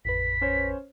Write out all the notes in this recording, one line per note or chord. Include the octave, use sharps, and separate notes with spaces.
A1 F2 B4 B6
C#4 C5 C#5